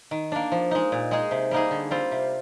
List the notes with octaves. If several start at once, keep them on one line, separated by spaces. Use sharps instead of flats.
D#3
A#3 D4
F3
G#3 D#4
A#2
G#3 D#4 G#4
C3
G3 A#3 D#4 G#4
D3
G3 C4 F4
C3